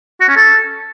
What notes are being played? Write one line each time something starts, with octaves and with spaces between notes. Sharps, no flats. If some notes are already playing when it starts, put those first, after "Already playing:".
F#4
C#4
A4